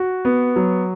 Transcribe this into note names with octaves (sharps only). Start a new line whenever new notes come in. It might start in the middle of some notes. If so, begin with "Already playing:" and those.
Already playing: F#4
B3
F#3